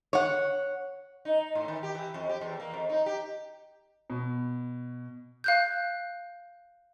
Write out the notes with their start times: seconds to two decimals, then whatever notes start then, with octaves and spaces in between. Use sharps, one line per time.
0.13 C#5 F#5
1.25 D#4
1.55 A2
1.68 D#3
1.83 G4
1.95 E3
2.14 F2
2.29 G4
2.41 E2
2.60 A#3
2.73 F2
2.89 D#4
3.06 G4
4.10 B2
5.44 F5 F#6 G6